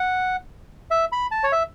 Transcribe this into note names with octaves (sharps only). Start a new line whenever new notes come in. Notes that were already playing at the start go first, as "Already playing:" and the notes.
Already playing: F#5
E5
B5
A5
C#5
E5